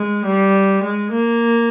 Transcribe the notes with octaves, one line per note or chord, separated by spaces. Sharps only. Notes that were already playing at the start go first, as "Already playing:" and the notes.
Already playing: G#3
G3
G#3
A#3